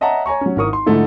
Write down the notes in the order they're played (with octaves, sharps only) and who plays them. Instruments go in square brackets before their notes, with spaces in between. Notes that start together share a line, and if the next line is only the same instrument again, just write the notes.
[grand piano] C#5 D#5 E5 F#5 A5 A#5
C#5 G#5 A#5 C#6
F#3 C#4
G#1 E4 A#4 C#6 D#6
C6
G#2 D3 F3 A3 D#4 E4